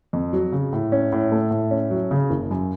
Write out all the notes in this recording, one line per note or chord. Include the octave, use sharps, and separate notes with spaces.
F2
F#3
C#3
A2
C#4
A2
A3
A2
C#4
F#3
C#3
F#1
F#2